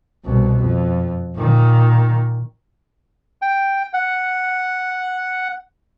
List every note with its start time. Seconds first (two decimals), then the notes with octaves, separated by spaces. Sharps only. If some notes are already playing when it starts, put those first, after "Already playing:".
0.24 C2 B2
0.59 F2
1.35 A#2 D#3
3.42 G5
3.93 F#5